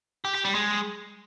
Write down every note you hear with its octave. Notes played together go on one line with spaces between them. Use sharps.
G4
G4
G3
G#3